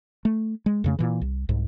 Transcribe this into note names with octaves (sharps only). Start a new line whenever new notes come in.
A3
G#3
F2 C#3 A3
A#2 E3
C2
C2 G#2